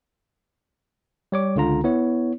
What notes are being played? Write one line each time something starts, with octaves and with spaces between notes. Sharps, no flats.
G3 C#5 D6
C#2 D3 F4 A#5
B3 E4 C#5